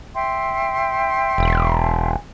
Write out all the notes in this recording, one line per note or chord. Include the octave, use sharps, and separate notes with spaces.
E5 G5 C6
E1